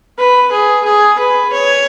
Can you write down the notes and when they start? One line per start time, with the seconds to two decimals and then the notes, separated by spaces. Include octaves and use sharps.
0.18 B4
0.52 G#4
0.85 G#4
1.19 B4
1.53 C#5